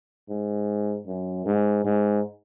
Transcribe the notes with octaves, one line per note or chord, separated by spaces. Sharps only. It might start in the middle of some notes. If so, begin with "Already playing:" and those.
G#2
F#2
G#2
G#2